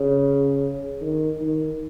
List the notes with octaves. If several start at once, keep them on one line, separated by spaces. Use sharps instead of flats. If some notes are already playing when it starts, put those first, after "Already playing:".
Already playing: C#3
D#3
D#3